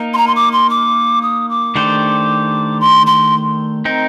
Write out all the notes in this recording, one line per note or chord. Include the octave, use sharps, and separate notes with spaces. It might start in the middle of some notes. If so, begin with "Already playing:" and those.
Already playing: A#3 D#4 A#4
C6
A#5
C6
D6
C6
D6
D#6
D6
D#3 A3 D4 G4 C5
C6
C6
C4 D#4 A#4